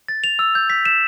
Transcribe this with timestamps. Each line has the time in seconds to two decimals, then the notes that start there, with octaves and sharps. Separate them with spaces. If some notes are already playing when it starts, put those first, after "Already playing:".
0.08 A6
0.24 F7
0.39 E6
0.55 G6
0.70 B6
0.85 E7